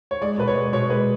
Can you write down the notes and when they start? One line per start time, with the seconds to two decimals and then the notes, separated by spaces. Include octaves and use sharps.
0.11 C#5
0.22 G#3 D5
0.38 B2 B4
0.48 C#5
0.55 G#3
0.73 B2 C#5
0.89 G#3 B4